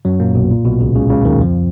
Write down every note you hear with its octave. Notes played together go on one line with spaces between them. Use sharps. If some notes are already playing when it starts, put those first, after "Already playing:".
F#2 F#3
A#2 A#3
B1 B2
A#2
B1 B2
C#2 C#3
C#2 C#3
C#2 C#3
D#2 D#3
F2 F3